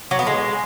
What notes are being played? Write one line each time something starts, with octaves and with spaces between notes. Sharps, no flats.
F#3
B3
G#3